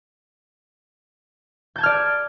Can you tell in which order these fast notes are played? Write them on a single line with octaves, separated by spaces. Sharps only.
G6 A5 G#6 F6 D5